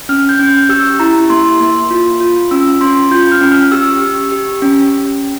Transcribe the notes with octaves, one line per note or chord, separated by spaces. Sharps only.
C#4 F6
G6
C#4
G6
G4 E6
E4 A#5
A#3 C6
A#3
F4
F4
C#4 E6
C#4 C6
F4 G6
F6
C#4
F6
G4 E6
G4
G4
C#4